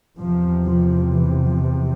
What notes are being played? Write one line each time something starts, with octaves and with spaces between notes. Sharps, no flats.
E2 C3 F3
F3
E3
F3